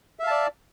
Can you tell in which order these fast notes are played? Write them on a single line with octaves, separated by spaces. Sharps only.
E5 F5 A5 D5